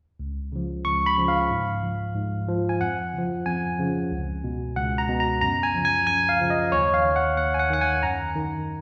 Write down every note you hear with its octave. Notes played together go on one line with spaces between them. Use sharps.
C#2
C#3 F3
C#2 C#6
B5
C#3 F3
F5
G#2
F3
G#2
F3
G#5
F2 F#5
C#3 F3
F2 G#5
C#3 F3
C#2
B2
C#2 F#5
A#5
B2
A#5
F#2 A#5
G#5
C#3 F3
G#5
F#2 G#5
F5
C#3 F3
D#5
D#2 C#5
F5
D#3
F#5
D#2 F#5
G#5
F#5
D#3 F#5
G#5
F#2 A#5
D#3